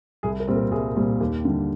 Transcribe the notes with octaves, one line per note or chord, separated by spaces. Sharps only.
C2 G#4
A#4
A#2 G3 C4
A#4
C2 G#4
A#2 G3 C4
D#2 G4
D3 G3